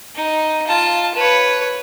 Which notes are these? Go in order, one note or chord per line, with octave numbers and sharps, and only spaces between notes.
D#4
F4 A5
B4 C#5